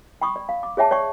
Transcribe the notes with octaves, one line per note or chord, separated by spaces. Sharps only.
G5 B5 C#6 D#6
D5
F5
D6
G#4 C#5 E5 G5 A5
C#5 D5 G5 C#6